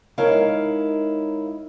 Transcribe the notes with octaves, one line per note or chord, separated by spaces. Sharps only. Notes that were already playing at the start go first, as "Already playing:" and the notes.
G#3 D#4 E4 A#4 C#5 F5